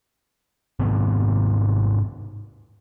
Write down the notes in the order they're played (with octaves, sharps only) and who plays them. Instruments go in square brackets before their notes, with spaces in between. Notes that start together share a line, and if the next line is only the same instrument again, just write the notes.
[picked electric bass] G#2 C3 D#3 B3